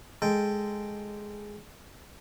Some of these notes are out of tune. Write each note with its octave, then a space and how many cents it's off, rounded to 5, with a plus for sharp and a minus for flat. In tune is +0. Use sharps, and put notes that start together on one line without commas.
G#3 +0 A4 +0 G5 +0